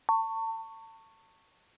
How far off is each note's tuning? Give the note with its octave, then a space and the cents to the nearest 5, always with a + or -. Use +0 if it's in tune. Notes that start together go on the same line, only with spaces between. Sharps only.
A5 +35 C#6 +0